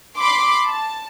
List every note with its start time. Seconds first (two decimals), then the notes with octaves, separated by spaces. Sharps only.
0.17 B5 C6 D6
0.66 A5